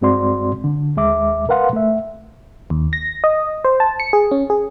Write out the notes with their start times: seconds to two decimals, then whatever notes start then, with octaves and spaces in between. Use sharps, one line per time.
0.01 G2 G#3 C4 F#4 D5 C6
0.64 D3
0.97 D#2 G#3 E5 D6
1.49 A#4 B4 F5 F#5 C6
1.73 A3 E5
2.70 D#2
2.93 A#6
3.24 D#5
3.65 C5
3.80 A5
4.00 C#7
4.13 G#4
4.31 C#4
4.50 G#4